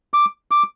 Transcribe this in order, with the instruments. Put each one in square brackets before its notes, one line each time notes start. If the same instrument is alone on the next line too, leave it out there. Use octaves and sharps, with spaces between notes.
[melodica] D6
D6